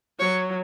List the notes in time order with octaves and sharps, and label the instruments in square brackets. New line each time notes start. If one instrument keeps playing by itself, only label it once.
[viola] F#3 [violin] C#5